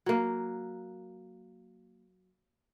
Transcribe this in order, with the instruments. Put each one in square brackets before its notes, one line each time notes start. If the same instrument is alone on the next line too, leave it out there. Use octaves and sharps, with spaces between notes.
[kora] F#3 A#3